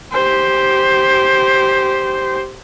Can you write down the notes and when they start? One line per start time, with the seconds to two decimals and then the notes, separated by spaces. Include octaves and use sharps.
0.13 G4 C5